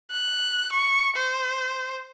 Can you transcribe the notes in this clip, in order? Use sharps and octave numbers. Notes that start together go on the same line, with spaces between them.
F#6
C#6
C5